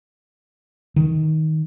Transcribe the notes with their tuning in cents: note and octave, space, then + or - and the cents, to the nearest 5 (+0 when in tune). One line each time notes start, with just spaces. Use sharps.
D#3 +15